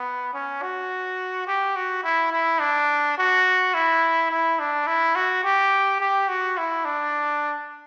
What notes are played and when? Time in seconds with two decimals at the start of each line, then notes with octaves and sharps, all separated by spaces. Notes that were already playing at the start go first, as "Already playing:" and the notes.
Already playing: B3
0.34 C#4
0.62 F#4
1.47 G4
1.76 F#4
2.04 E4
2.32 E4
2.60 D4
3.18 F#4
3.74 E4
4.30 E4
4.60 D4
4.87 E4
5.16 F#4
5.44 G4
6.00 G4
6.28 F#4
6.58 E4
6.85 D4